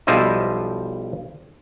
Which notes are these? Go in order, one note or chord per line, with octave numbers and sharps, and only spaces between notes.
B1 F3 G3 E4 C5 D#5